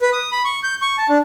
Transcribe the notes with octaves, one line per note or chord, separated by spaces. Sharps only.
B4
D#6
B5
C#6
G6
C#6
A5
D4